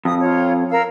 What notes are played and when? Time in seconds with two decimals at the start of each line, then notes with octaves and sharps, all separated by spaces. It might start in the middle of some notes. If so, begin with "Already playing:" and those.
0.05 F2 D#6
0.21 F4 C#5
0.71 A#4 F5 E6